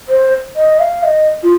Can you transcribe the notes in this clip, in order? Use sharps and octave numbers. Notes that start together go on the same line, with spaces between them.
C5
D#5
F5
D#5
F4